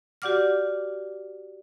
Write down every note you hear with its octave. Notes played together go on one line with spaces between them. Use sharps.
F#4 G4 D5 F#5 D6 F6